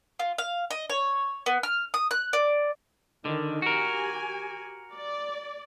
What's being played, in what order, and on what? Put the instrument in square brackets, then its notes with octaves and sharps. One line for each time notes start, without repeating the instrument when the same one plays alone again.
[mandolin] F4
F5
D#5
C#5
B3
F6
D#6
F#6
D5
[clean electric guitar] D3 [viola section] D#3
[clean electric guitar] F#4 A#4 [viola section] G4 G#5
[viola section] D5